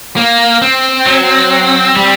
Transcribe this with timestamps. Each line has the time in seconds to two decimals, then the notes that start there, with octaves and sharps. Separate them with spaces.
0.16 A#3
0.62 C4
1.06 F#3
1.96 G3